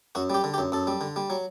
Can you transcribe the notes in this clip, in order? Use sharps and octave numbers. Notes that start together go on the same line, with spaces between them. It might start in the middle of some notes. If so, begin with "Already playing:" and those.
F#2 F#4
G3 G4
D3
G4
F#2
F#2 A4
G3
D3
G3
F#3